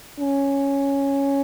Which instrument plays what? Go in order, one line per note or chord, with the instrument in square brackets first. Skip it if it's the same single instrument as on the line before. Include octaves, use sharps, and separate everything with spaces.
[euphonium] C#4